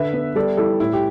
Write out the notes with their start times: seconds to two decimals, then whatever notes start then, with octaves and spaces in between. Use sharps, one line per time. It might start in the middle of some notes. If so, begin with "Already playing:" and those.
Already playing: D3 B4 E5
0.13 B3
0.35 G3 A4 D5
0.57 G3 E4 A4
0.80 A2 E4
0.93 G4